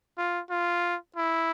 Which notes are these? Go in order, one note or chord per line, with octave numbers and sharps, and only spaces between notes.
F4
F4
E4